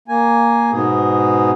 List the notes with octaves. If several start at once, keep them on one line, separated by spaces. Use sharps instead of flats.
A#3 G#5
G#2 B2 B3 G#4